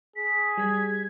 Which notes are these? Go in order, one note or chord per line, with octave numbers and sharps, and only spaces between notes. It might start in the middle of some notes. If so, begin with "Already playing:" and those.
G#4 B6
G3 G#6 B6